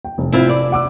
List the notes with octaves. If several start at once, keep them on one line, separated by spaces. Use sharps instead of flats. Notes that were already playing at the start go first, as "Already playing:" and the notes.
G5
F1
C4 E4 F4
D5
F#5 D6 E6